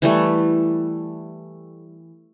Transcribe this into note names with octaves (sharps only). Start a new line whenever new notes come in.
E3 G3 A3